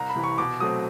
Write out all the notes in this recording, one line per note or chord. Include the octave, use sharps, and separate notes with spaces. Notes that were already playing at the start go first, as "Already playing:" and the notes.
Already playing: C2 A#5
B5
C3 E3
C#6
B2 D6
F#3 A3 C4 D#6